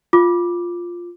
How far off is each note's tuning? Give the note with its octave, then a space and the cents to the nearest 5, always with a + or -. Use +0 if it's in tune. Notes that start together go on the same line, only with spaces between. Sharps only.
F4 +0 D6 +0